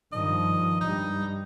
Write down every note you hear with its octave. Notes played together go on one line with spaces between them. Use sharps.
G2 D#3 F3 D#5
G2 G3 D#4